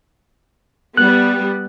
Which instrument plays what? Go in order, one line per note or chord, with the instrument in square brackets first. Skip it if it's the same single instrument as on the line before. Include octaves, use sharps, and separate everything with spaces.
[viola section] G3 B3 [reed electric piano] F#6